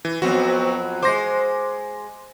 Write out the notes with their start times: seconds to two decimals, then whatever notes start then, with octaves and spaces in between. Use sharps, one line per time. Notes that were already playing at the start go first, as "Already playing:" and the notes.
0.05 E3
0.22 F2 F#3 B3 C4 F#4
1.03 G#3 C5 D6 A#6